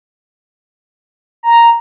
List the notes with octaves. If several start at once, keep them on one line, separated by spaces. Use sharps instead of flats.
A#5